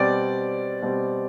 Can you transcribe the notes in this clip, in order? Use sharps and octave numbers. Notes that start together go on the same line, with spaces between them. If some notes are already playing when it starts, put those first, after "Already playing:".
Already playing: B2 G3 C4 D5
B2 G3 C4